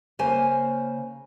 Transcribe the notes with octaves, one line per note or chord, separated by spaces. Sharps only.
C#3 A#3 C5 G#5